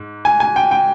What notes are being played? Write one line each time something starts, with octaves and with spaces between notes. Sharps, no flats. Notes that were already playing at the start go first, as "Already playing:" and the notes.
Already playing: G#2
G#5
G#5
G5
G5